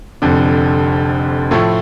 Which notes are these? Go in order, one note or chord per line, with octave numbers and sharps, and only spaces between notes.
F1 F2 D3
A2 F3 A3 E4